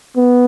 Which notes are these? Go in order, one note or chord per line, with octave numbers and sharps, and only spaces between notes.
B3